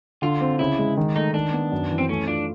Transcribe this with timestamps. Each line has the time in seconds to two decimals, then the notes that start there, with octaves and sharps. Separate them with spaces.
0.22 D3 F4
0.41 C4
0.59 C#3 E4
0.79 G#3
0.97 D#3
1.16 A3 D#4
1.34 D#3 D4
1.53 B3
1.72 F#2
1.91 E3
1.98 C4
2.09 A3 C#4
2.28 D4 F4